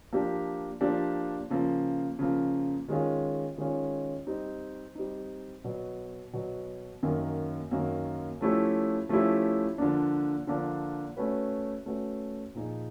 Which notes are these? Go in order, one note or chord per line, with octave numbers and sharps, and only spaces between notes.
F3 A#3 D4 G4
F3 A#3 D4 G4
C#3 F3 A#3
C#3 F3 A#3
D#3 G#3 C#4 F4
D#3 G#3 C#4 F4
G3 C4 D#4
G3 C4 D#4
B2 F#3 B3
B2 F#3 B3
F#2 D#3 F#3 A#3
F#2 D#3 F#3 A#3
F3 A3 C#4 E4 G4
F3 A3 C#4 E4 G4
D3 F3 A#3 D4
D3 F3 A#3 D4
A3 C#4 F#4 B4
A3 C#4 F#4 B4
A#2 F3 A#3 D#4 G#4